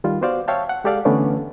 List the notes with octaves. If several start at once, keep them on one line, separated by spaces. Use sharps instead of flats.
D#3 G3 F4
B3 F#4 C5 D5 F5
C#5 E5 F5 G5 A5
F#5
G#3 G4 A4 D5 F5
D3 E3 A3 B3 C#4 D4